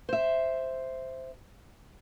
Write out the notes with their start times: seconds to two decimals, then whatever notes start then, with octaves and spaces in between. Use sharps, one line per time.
0.09 C5 E5